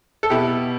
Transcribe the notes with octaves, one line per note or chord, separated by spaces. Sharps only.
A4
B2 B3 E4 G4